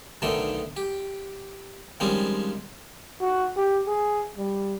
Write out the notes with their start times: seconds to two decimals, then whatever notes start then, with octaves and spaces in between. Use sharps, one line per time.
0.22 B1 D3 D#3 A3 G5
0.77 G4
2.00 D#3 F3 G3 G#3 C4 C#4
3.21 F#4
3.57 G4
3.87 G#4
4.37 G3